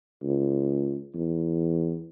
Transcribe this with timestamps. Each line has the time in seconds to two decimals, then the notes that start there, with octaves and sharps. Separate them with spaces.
0.22 C#2
1.15 E2